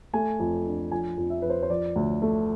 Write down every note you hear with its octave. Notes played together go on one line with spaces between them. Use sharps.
A3 G#5
F2
D4
F3 G#5
F2
E5
F2 B4
C5
C5
F3 D5
D2
A3